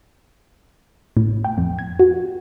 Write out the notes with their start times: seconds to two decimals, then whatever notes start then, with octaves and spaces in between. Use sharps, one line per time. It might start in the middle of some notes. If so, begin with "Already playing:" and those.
1.17 A2
1.44 G5
1.58 F2
1.79 G#6
1.99 F#4